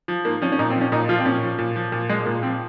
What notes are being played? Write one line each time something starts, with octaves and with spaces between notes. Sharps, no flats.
F3
G#2 A#3
F3 C#4
C#4
A#2 D#4
C4
F3
C#4
A#2 D#4
F3 F4
C4
A#2 C#4
F3
A#2
F3
A#2
F3 G#3
A#2 A#3
F3 C4